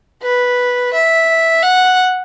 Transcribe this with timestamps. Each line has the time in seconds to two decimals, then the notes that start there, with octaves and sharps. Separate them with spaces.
0.22 B4
0.93 E5
1.63 F#5